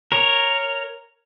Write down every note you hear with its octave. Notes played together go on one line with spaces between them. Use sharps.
A#4 C#5